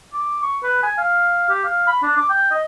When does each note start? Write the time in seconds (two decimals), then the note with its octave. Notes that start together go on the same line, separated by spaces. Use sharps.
0.13 D6
0.43 C#6
0.63 B4
0.83 G#5
0.98 F5
1.49 G4
1.64 F5
1.87 B5
2.03 D4
2.17 D6
2.30 G5
2.51 D#5